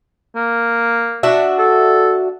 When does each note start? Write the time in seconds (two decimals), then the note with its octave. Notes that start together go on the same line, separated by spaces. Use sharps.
0.36 A#3
1.23 D4 F#4 E5
1.59 A4